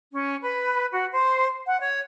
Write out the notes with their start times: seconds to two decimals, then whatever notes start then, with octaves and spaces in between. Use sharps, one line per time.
0.13 C#4
0.41 B4
0.91 F#4
1.13 C5
1.65 F#5
1.80 C#5